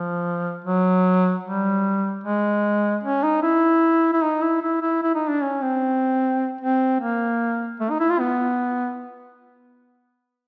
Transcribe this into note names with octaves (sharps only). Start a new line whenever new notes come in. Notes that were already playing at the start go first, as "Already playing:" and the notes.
Already playing: F3
F#3
G3
G#3
C#4
D#4
E4
E4
D#4
E4
E4
E4
E4
D#4
D4
C#4
C4
C4
A#3
A3
D#4
E4
F4
B3